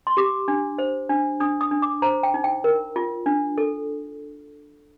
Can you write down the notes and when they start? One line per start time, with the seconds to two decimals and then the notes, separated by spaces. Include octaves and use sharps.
0.07 C6
0.17 G4 D6
0.48 D4
0.78 C5
1.09 D4
1.40 D4 D#6
1.61 D#6
1.71 D4
1.82 D6
2.02 C5 A#5
2.23 G5
2.34 D#4
2.44 G5
2.64 A#4
2.96 F4
3.26 D4
3.58 A4